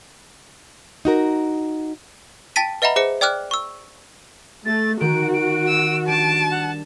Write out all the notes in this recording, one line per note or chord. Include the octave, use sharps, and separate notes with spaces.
D#4 F#4 A#4
G5 A5 A6 B6 D#7
B4 D#5 E5 F#5 A#5 B5
G#4 C5 E5 C#7
D5 G5 D6 F6 F#6
C#6 E6
A3 A6
D#3 F#4 D7
D7
E6
G3 D4 A5 D7
F#5